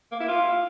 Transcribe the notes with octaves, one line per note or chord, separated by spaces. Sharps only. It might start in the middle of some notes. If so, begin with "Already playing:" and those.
A#3
E4
F4